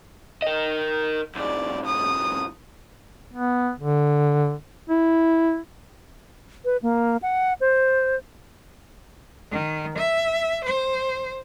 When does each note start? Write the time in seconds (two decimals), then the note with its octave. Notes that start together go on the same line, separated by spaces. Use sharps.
0.42 A#4 D#5
1.36 B1 G#2 D5
1.86 D#6
3.33 B3
3.79 D3
4.89 E4
6.65 B4
6.82 A#3
7.23 F#5
7.61 C5
9.51 D#3
9.97 E5
10.63 C5